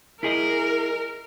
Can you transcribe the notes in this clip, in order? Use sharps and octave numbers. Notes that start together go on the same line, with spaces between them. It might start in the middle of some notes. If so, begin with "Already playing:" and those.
E4 G#4 A#4 D#5